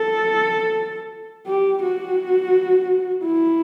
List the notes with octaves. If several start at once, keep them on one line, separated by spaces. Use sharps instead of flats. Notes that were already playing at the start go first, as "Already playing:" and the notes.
Already playing: A4
G4
F#4
E4